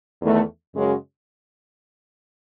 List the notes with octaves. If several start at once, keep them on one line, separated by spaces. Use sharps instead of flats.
E2 D#3 A3
F#2 C#3 G#3 C#4 F#4